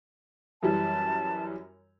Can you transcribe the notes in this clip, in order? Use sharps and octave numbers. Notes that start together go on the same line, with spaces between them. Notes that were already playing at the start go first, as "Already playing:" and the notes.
F#2 E3 G3 A5